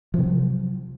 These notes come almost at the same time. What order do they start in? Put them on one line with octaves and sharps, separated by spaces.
F3 C3 F#3